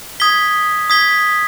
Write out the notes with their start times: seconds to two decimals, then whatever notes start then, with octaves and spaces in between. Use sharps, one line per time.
0.20 D#6 G#6 B6 G7
0.90 D#6 G#6 B6 G7